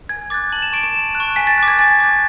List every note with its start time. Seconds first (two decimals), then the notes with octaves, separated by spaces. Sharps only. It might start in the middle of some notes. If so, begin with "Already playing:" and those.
0.09 G#5 G#6
0.30 D6 F#6 A6
0.53 A5 F#7
0.62 E7
0.73 C#6 F#6 D7
0.83 E7
0.95 A5
1.15 F#6
1.20 C#6
1.36 G#5 B6
1.47 A6
1.58 D6 F#6
1.68 G#6
1.79 G#5 A6
2.00 D6 F#6